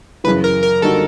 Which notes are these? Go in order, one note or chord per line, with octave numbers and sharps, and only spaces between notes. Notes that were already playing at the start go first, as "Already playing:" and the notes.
F#2 C#3 E3 B4
A#4
A#4
D3 G3 A#3 D#4 F#4 A4